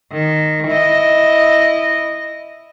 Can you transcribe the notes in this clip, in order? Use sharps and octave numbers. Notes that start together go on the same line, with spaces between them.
D#3
E4 D#5